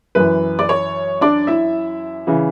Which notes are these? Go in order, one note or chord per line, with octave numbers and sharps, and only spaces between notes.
F#2 E3 B4
D5
C#5
D4 D5
E4 E5
C#3 E3